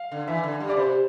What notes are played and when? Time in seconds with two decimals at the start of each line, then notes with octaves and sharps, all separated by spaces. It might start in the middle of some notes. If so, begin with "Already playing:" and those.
Already playing: F5
0.12 D3
0.27 E3 E5
0.43 D3
0.60 G3
0.69 D5
0.77 C3 C5